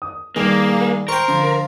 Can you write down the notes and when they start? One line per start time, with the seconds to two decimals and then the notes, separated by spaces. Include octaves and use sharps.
0.02 D#6
0.36 G2 D#3 A#3 G#4 E7
1.08 A#4 C5 G5 C#6
1.28 D3 F3